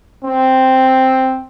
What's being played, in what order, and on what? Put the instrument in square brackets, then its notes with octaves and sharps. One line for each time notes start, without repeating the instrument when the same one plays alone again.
[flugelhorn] C4